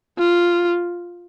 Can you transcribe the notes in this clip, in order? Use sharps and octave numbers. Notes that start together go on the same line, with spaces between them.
F4